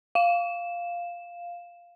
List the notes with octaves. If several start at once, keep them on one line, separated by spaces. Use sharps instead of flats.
F5 E7